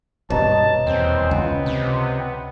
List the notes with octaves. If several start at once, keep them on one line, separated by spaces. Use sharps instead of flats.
D#1 G2 B2 C#5 D#5 A5 A#5
E2 C4
C#2 B3
C3